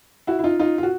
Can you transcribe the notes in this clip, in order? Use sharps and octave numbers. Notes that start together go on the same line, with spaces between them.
E4 F#4
E4
D#4 F4
D#4 F4
F4
F#4